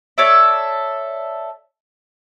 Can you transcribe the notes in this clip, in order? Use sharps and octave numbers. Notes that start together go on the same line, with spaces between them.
A4 C#5 D5 E5